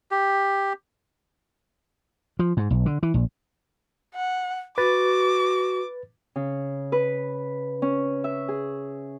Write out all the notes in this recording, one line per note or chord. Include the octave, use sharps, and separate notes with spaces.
G4
F3
G#2
B1
D3
E3
A#1
F#5
F#4 B4 D6 A6
C#3
B4
C#4
E5
G#4